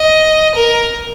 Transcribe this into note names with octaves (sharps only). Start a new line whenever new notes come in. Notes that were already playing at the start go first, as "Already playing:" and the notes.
Already playing: D#5
A#4